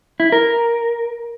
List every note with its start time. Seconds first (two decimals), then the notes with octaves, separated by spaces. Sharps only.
0.20 E4
0.32 A#4